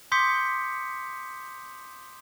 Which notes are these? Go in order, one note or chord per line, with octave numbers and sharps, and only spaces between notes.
C6 D6 D#6 G6 B6 C#7